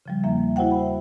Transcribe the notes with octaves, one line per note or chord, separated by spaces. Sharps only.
C#3 F3 G3
E2 F3 A#3 E5
E4 F#4 C5 E5 F#5 G5
B5